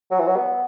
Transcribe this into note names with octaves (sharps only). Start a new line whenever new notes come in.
F#3
E3
F#3
B3